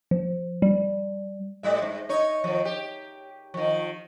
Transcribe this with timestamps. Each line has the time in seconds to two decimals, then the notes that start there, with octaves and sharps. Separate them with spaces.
0.11 F3
0.62 G3
1.63 A2 G3 E5
1.82 G#2
2.09 D#4 C#5
2.44 D#3 F3
2.65 G4
3.54 D#3 F3